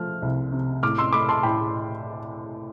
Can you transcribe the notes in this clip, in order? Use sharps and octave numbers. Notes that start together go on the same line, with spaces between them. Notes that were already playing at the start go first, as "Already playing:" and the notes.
Already playing: F3 A3 F6
C2
C3
A2 D6 F6
C6 E6
A3 B5 D6
A5 C6
A2 G5 B5